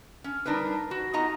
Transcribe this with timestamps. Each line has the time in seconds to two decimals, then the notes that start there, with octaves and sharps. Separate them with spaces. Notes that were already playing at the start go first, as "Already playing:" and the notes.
0.24 C#4
0.46 G3 D4 D#4 A#4 B4
0.91 F#4
1.13 B3 D#4 F4 D#5 A#5